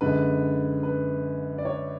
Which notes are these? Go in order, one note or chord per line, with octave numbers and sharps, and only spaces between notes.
F#2 D3 G#3 B4
B4
D5
C#5